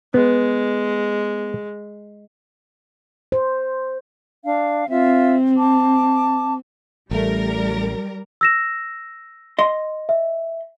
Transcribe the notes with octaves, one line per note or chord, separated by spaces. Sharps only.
G#3 B3
C5
D4 F5
C4 F4 E5
A5 D6
A1 G3 A3 A#4
E6 A#6 E7
D#5 C6
E5